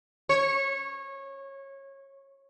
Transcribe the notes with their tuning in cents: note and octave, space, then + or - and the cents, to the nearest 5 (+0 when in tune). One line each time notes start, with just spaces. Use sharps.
C#5 -20